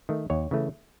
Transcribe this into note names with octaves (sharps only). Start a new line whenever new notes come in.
D#3 A3
D#2 C#5
C#3 E3 A3